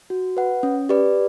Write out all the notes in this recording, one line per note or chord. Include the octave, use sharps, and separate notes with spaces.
F#4
B4 F#5
C#4
G4 B4 D5